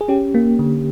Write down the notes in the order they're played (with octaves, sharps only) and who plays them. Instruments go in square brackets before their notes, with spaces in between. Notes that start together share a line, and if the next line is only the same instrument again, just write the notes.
[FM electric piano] G#4
C#4 G4
A#3
D3